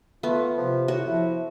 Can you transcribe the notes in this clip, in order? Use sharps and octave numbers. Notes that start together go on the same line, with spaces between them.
A3 B3 F4
C3 F3
A2 F#4
F3 E4